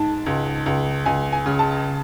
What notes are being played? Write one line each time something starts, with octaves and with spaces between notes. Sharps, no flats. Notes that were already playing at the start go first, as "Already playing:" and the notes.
Already playing: G#2 A5
C#2
C#2
C#2 G#5
G#5
C#3
A5